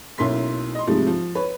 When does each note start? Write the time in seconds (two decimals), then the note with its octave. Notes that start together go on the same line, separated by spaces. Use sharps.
0.18 B1 A#3 C#4 E4 C6 B6
0.75 D#5 C6
0.87 G#2 C3 F3 G3 A3
1.07 F3
1.35 B4 C#5 B5